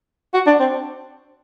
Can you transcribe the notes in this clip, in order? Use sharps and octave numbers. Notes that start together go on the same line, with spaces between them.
F#4
D4
C4